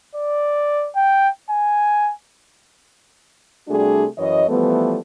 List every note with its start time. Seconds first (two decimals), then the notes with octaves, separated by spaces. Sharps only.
0.15 D5
0.96 G5
1.50 G#5
3.68 C3 G3 A3 D4 F#4 G#4
4.18 F#2 E3 C#5 D#5
4.48 E3 F3 G3 A3 B3